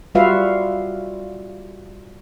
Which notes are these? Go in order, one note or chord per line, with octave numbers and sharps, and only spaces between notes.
G3 F4 F#4 B4 E5 F5